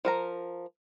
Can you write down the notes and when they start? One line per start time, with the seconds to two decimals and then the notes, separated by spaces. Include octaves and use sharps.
0.05 F3 A#4 A#5